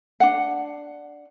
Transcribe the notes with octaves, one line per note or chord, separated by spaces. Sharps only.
D4 F#5